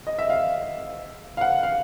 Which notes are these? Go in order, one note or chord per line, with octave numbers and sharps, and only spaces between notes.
D#5
E5
F5
F5
F#5
F5